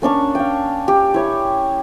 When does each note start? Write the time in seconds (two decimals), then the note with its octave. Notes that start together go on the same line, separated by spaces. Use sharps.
0.02 A#3 C#4 D4 C#6
0.35 F5 G5
0.88 G4
1.14 E4 C#5